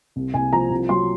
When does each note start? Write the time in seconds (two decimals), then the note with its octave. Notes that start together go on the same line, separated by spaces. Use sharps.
0.16 C2
0.34 C2 G#5
0.53 F3 A#5
0.71 C2
0.89 F#3 C6